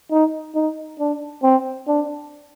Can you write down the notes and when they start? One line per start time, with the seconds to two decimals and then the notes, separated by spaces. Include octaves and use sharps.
0.11 D#4
0.55 D#4
1.00 D4
1.43 C4
1.88 D4